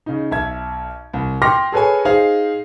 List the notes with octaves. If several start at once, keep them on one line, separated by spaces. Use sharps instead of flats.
C#3 D#4
B1 E5 G#6
C2
G5 C6 D6 F6 A#6
G#4 A4 B4 C#5 G#5
D#4 G#4 C5 F5